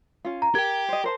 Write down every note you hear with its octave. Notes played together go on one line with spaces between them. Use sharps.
C#4 F4
A#5
G4 A#4 G5 G#6
C5 D#5
A#4 C5 A5